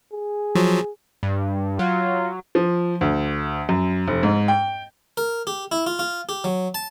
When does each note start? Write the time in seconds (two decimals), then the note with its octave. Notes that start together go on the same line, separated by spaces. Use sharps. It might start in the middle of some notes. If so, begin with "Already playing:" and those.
0.12 G#4
0.55 F3 F#3
1.23 G2
1.79 F#3 F4
2.55 F3
3.01 D2
3.69 F#2
4.08 F1
4.23 G#2
4.48 G5
5.17 A#4
5.47 G4
5.72 E4
5.86 F4
5.99 F4
6.29 G4
6.44 F#3
6.74 A5